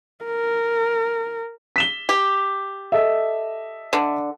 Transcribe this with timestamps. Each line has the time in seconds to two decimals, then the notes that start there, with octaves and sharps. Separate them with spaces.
0.24 A#4
1.76 B6 E7 G7
2.09 G4
2.92 A4 D#5 E5
3.93 D3